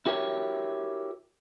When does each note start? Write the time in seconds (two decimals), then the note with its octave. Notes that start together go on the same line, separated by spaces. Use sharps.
0.06 E4 F#4 G4 A#4 C#5